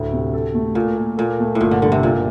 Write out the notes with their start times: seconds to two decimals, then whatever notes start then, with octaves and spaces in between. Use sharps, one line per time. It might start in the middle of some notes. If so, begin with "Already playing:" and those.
Already playing: D2 A2
0.13 C3
0.34 A4
0.54 A3
0.75 A#2 A4
0.97 A#3
1.17 A#2 A4
1.40 A3
1.55 A2
1.61 G1 A#2
1.71 D3
1.82 G2 D3
1.92 C3
2.03 G1 A#2